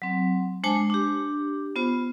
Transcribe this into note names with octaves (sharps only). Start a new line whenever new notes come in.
F#3 C4
G#3 D4 C5 G#5 A5
D4 G4
B3 F4 C5